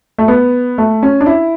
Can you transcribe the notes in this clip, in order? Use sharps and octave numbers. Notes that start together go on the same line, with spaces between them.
A3
B3
A3
C#4
D4
E4